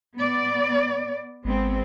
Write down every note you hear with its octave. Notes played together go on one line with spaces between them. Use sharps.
B3 D5
G#1 G#3 B3 C4